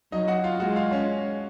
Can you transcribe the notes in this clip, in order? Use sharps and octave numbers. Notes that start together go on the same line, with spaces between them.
F#3 D#4 D#5
F#4 F#5
F4 F5
G#3 F#4 F#5
F4 F5
C#4 C#5